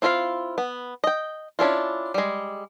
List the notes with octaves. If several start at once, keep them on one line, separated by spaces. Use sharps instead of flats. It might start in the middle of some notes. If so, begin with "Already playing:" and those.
C4 E4 F4 A#4 F5
B3
D#5 G5
C#4 D4 E4 F4
G3 G#3